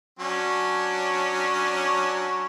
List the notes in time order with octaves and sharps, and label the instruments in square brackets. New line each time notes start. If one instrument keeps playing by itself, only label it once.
[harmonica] F#3 C#4 D4